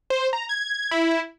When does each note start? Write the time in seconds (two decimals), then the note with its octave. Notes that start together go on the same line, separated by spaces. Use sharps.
0.10 C5
0.33 A#5
0.49 G#6
0.91 E4